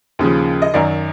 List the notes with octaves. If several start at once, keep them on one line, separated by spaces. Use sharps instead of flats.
D#2 C#3 F3
D#5
F#2 D#3 F#3 D5